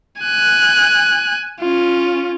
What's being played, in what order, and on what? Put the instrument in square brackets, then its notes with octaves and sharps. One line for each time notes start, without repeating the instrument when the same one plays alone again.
[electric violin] G#5 F#6
C#4 F4